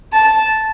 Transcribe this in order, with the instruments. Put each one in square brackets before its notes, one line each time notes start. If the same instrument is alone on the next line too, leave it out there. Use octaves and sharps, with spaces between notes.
[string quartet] A5